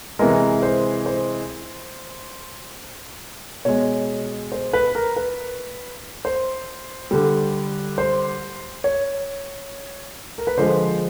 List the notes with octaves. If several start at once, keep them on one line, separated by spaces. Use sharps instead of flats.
C3 E3 G#3 A#4
C5
C5
B2 G#3 C#5
C5
B4
A#4
B4
C5
D3 G3
C5
C#5
A#4
B4
D3 F3 G#3 C5